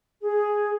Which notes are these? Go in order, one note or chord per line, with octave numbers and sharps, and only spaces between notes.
G#4